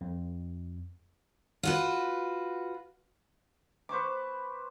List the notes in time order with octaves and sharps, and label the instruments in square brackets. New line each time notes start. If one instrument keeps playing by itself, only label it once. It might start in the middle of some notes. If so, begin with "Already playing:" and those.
[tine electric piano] F2
[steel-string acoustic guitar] F4 F#4 B4
[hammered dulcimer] B4 C5 C#6 D6